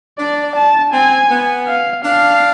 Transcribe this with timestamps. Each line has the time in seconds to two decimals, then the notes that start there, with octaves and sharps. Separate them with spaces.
0.19 D4 D5
0.56 A5
0.93 C4 G#5
1.30 B3
1.68 F5
2.04 D4 F5